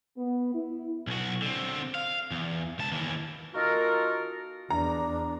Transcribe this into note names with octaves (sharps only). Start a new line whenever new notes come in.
B3
E4
B1 F#4
D3 C4
F5
E2
C#2 A5
D#2 E3
A#3 D#4 F4 F#4 A4 A#4
E2 D4 A#5